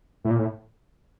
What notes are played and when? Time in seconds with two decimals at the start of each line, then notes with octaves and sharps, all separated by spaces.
0.25 A2
0.30 A#2
0.39 A2